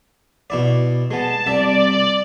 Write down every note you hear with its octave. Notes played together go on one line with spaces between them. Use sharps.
B2 E4 D5
G#3 B3 A5
C2 D5 E5